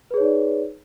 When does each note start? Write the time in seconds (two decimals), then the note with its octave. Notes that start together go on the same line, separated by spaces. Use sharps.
0.11 B4
0.14 G#4
0.17 C#5
0.20 D#4
0.24 D5